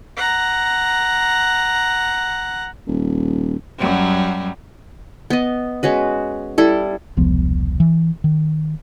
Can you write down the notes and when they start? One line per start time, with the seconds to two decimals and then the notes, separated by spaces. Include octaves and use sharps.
0.17 F#5 A#5
2.88 D#1
3.78 F#2 F#3 G3
5.30 B3 D#5
5.83 G#3 C#4 F#4 B4
6.58 G3 E4 A4
7.17 E1 C2 F3 B3
7.80 E3
8.24 D#3